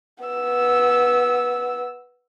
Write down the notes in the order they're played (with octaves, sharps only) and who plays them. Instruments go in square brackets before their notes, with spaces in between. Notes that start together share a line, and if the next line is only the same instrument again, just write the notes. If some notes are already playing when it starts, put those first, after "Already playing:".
[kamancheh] B3 E6